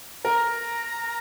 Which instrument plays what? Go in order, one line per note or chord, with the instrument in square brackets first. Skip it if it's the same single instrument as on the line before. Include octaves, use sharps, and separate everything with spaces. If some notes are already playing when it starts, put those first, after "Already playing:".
[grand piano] A#4 [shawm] A#5